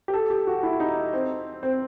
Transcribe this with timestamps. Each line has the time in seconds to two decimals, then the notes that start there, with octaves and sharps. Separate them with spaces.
0.08 G4
0.14 A4
0.30 G4
0.47 F#4
0.63 E4
0.80 D#4
1.13 C4
1.63 C4